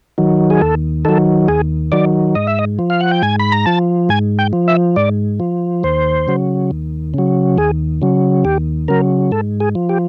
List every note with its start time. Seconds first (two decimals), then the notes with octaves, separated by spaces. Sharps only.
0.18 D#3 F#3
0.50 G#4
0.62 D#2 A4
1.05 D#3 F#3 A4
1.48 D#2 G#4
1.92 D#3 F#3 D5
2.35 G#2 D#5
2.47 E5
2.59 D#5
2.79 F3
2.90 F5
3.00 F#5
3.11 G5
3.23 G#2 G#5
3.40 B5
3.52 A#5
3.66 F3 A5
4.09 G#2 G#5
4.39 G5
4.53 F3
4.68 E5
4.96 G#2 D5
5.40 F3
5.83 D#2 C5
6.28 C#3 F#3
6.71 D#2
7.14 C#3 F#3
7.58 D#2 G#4
8.02 C#3 F#3
8.45 D#2 G4
8.88 C#3 F#3 A#4
9.32 G#2 A4
9.60 G#4
9.75 F3
9.89 G4